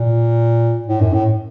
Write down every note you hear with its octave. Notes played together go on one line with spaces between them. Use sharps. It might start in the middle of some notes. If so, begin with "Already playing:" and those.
Already playing: A#2
A2
F#2
A2